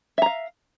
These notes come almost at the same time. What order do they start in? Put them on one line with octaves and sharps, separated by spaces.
E5 A#5 F5